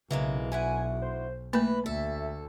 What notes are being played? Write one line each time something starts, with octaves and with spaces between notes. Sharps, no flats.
B1 C#3 E3 G#3 A#3
D2 E4 F#5 G#5
C5
E3 A3 A#3 B4 B5
D2 A4 E5